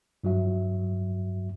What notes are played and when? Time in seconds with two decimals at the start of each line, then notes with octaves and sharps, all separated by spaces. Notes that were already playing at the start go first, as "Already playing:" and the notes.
0.24 G2 F#3 F#4 E5